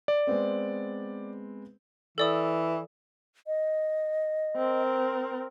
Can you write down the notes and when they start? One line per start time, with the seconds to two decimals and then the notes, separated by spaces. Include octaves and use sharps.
0.08 D5
0.27 G#3 B3 C4
2.18 E3 A4 D5 D#6
3.47 D#5
4.56 C4 A#4